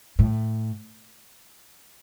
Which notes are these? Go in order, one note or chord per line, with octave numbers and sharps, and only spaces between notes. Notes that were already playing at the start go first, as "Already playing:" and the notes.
A2